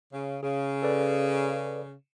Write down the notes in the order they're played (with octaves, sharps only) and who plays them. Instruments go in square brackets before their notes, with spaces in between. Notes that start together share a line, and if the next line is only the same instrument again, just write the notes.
[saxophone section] C#3
[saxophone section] C#3 [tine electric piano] G#4
[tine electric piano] A4 B4 D5